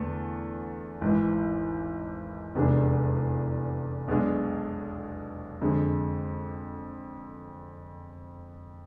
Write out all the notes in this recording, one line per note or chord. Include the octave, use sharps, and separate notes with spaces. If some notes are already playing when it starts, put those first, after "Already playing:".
Already playing: E2 D3 A3
G#1 G#2 E3
F1 E2 C3 G#3 D4
B1 B2 G#3 D4
F2 D3 G#3